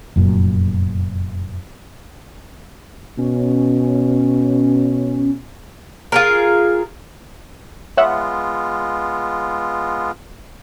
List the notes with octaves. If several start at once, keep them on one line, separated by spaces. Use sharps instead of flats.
F1 F#2 A#2
B2 C#4
F4 G#4 A#4
G#3 B3 F4 C#5 E5 F#5